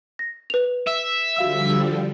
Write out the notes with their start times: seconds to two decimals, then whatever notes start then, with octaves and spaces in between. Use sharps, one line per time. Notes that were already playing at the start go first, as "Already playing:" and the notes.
0.19 A#6
0.50 B4 F7
0.87 E5
1.36 D3 F3 G3 F#4 F5 E6